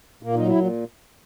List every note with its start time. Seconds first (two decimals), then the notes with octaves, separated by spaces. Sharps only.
0.23 A#2 A#3
0.35 F#3 D#4
0.47 E4
0.55 A#2